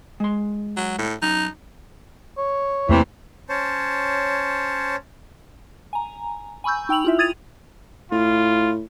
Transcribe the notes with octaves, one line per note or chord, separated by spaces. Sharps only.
G#3 C6
F#3
A2
F#2 D#4
C#5
E2 C3 E3 A3 A#3
C#4 C5 C#5 A5
G#5 A#5
G#5 B5 C#6 E6 G6
D#4 G5 E6 F7 F#7
E4 F4 E5
D#6 G#6 A6 D#7 F7
A2 F4